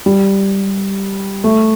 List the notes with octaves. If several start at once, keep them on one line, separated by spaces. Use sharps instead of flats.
G3
A3